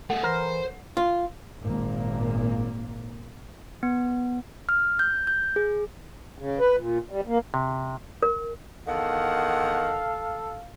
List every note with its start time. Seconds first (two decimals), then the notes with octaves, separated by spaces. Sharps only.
0.10 A3 G#4 A4 F#5
0.23 E3 A#4 C5
0.97 F4
1.63 G#1 A#2 A#3
3.83 B3
4.69 F6
4.99 G6
5.27 G6
5.56 G#4
6.38 C#3
6.59 B4
6.77 A#2
7.11 G3
7.27 A#3
7.54 C3
8.23 A#4
8.88 E2 D#3 A4 F5 F#5